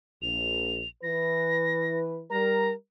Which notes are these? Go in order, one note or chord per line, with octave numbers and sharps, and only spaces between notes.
A#1 F7
E3 B4 A#6
G3 A#4 A#5